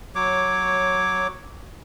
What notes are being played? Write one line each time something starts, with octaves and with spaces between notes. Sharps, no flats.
F#3 C#5 D6